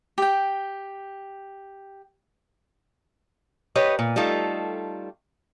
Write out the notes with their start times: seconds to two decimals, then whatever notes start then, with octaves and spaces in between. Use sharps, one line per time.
0.18 G4 G5
3.75 G4 B4 C#5 D#5
3.99 A#2
4.16 G3 A3 D#4 F4 A4